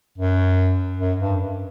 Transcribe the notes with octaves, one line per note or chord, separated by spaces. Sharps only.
F#2
F#2
G2